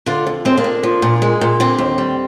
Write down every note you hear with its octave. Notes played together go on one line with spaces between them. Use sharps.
D3 D4 F4
F2
G#3 C4
A#3 D4
F2
F3
A#2
G#3
A#2
D3 C4
D#2
G3